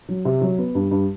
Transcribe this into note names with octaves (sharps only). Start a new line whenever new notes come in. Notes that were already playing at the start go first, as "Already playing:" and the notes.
F#3
C3
F#3
B3
G2
G2